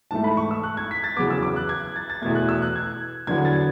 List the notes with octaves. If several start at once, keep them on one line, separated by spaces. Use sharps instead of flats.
G#2 E3 A3 A5
B5
C#6
E6
F#6
G#6
B6
A6
E2 C#3 F#3 B3 D6
E6
D6
F#6
G#6
A6
A6
E2 B2 A3 G#6
F#6
E6
F#6
G#6
E2 D3 F#3 B3 G#6
A6